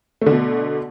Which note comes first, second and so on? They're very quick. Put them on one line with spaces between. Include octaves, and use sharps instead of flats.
A3 D3 B2